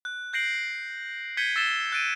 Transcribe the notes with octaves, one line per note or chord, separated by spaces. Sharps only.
F#6
F#6 G6 A#6 C7 D7 F#7
G6 G#6 B6 C#7 D#7 G7
E6 A6 B6 C7 E7 G7
F#6 A6 D7 D#7